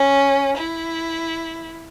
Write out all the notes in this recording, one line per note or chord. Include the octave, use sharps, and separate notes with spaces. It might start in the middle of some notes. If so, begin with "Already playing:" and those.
Already playing: C#4
E4